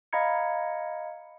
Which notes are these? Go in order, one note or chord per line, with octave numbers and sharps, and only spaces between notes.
D#5 F5 A#5 B5 G#6 C#7